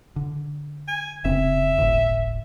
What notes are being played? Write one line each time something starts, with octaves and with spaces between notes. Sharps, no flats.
D3
G#5
F1 C#3 C4 E5
D1 G1 A2